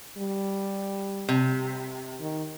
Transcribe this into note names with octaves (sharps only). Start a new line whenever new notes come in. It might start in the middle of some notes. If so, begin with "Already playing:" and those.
G3
C3
D#3